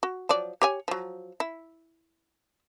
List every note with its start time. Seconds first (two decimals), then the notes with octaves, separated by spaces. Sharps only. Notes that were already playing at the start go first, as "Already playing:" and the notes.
0.03 F#4
0.29 F3 F#3 D5
0.62 G4 C#5 G#5
0.88 F3 F#3
1.40 E4